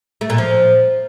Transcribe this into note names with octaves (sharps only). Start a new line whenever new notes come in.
A3
A#2
F3